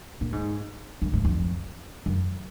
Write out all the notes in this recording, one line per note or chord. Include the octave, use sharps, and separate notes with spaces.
A#2
G#2
F#2
G#2
F2
F#2